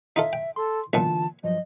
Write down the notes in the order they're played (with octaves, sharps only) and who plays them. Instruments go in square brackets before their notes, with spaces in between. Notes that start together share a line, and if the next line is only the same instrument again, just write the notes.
[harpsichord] D#4 F4 A4 [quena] E5
[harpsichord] G5
[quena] A4 [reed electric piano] C6
[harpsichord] B1 A#2 [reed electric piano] D3 E3 F4 [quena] A5
[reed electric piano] G2 F3 F#3 [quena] D#5